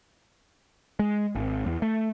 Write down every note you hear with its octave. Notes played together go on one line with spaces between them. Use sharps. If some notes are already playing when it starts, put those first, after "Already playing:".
G#3
G#1
E2
A3